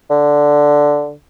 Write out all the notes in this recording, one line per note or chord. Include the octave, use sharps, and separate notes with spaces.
D3